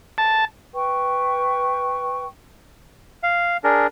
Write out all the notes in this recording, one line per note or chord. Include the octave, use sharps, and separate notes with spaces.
A5
B4 G5 C#6
F5
D4 G#4 A#4